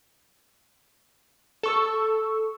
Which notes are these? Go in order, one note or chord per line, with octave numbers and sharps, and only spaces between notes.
A4 C#6 E6